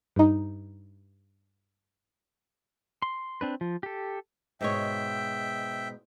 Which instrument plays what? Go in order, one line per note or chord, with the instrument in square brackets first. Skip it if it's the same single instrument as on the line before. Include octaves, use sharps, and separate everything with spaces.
[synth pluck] G2 D#4
[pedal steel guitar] C6
C4 D4 B4
F3
G4 A4
[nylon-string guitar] G#2 B2 C#5 [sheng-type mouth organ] E5 G5